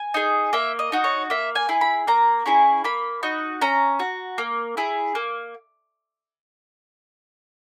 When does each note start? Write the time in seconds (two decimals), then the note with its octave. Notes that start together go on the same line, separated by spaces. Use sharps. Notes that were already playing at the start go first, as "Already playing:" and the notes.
Already playing: G#5
0.14 D#4 G#4
0.53 A#3 E5
0.79 D#5
0.92 D#4 F#4
1.04 C#5
1.30 A#3 E5
1.55 G#5
1.69 E4 G#4
1.81 B5
2.07 A#3 A#5
2.46 C#4 E4 G#4
2.84 A#3 B5
3.23 D#4 F#4
3.61 C#4 A#5
3.99 F#4
4.38 A#3
4.77 E4 G#4
5.15 A#3